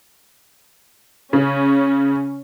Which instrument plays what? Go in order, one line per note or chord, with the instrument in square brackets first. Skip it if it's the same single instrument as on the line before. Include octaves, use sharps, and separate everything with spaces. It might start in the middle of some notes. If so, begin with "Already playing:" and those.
[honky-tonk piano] C#3 [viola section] C#4